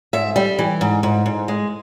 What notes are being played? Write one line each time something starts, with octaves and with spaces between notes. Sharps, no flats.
G#2 E5
G3
E3
G#2
G#2
G#2
G#3